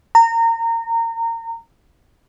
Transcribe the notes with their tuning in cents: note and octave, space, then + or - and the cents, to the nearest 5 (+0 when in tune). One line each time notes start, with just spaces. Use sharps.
A#5 -25